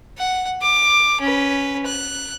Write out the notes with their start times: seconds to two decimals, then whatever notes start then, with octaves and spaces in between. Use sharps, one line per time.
0.18 F#5
0.62 D6
1.21 C#4 B4
1.86 F#6